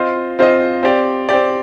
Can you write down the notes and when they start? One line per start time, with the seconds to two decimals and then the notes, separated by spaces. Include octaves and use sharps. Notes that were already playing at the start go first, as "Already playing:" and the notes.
Already playing: C4 F4 C5 D#5
0.39 C4 F4 C5 D#5
0.83 C4 G4 D5
1.29 C4 G4 D5